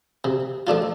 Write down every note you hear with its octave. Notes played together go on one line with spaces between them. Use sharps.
C3
F3 A3 D4 F4